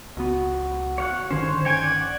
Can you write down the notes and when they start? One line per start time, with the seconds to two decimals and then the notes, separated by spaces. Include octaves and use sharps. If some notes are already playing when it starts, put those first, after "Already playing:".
0.17 C#2 B3 F#4
0.98 C#5 F5 F#5
1.31 G1 D3 D#3 C#4 C5 C#5
1.65 C#5 G5 G#5 G#6
1.83 D5 F#5